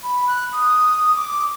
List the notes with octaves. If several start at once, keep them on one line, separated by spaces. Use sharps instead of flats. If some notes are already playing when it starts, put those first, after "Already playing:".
B5
F#6
D#6
D6